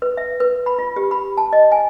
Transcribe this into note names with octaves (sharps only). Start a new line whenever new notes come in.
B4
E5
B4
B5
F4
G4
B5
A5
D#5
G#5